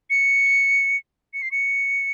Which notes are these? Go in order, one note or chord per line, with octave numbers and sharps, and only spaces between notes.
C#7
C#7
C7
C#7